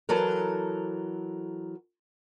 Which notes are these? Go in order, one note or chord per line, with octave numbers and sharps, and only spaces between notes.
E3 F#3 A4 A#4